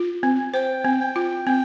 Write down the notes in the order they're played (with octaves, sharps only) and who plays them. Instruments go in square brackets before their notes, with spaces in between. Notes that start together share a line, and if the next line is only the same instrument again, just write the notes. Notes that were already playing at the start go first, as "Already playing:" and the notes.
Already playing: [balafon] F4
C4
[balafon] C5 [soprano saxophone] G5
[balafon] C4
[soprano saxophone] G5
[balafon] F4
[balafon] C4 [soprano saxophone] G5